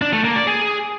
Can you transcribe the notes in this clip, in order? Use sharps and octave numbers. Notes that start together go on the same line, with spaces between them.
D4
A3
A#3
D5
G#4